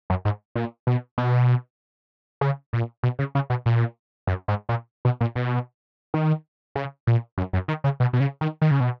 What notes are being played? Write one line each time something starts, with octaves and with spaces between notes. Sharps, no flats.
F#2
G#2
A#2
B2
B2
C#3
A#2
B2
C#3
C#3
B2
A#2
F#2
G#2
A#2
B2
A#2
B2
D#3
C#3
A#2
F#2
F#2
D#3
C#3
B2
B2
C#3
D#3
D#3
C#3
B2